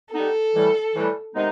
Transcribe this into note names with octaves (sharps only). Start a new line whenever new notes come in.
G3 B3 D#4 A4
A2 E3 G3
A2 E3 G3
C3 D#3 G#3 B3 D#4